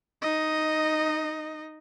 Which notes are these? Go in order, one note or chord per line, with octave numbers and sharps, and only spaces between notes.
D#4 D#5